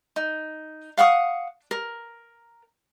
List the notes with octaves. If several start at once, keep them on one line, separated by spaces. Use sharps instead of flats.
D#4
F5 F#5 C#6 D#6
A#4